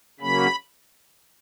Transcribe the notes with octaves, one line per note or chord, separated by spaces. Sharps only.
C#3 F#3 A#3 C#4 B5